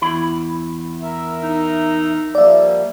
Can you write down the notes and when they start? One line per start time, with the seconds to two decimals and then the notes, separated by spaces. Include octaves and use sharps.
0.01 E2 E4 B5
1.02 A#4 E5
1.43 D#4
2.35 F3 G3 A#3 D5 E5